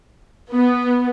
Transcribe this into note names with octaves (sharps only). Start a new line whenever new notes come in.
B3